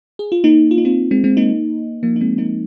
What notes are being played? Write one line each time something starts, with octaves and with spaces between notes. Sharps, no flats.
G#4
F4
A#3 D#4
F4
D#4
C4 F4
G#3 C4
G#3 C4
A#3 D#4
F3 A#3
D#4
G#3 C4
A#3 D#4